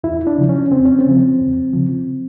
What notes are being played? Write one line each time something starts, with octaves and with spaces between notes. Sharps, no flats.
E2 E4
D4
C#3 F3
C#4
E2 C4
C#4
C4
C#3 F3
E2
C#3 F3